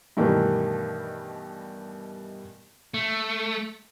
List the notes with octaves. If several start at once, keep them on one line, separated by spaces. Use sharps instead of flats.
G2 B2 D#3 E3 G3 A3
A3